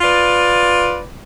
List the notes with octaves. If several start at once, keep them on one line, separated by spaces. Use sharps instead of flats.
F4 B4 D5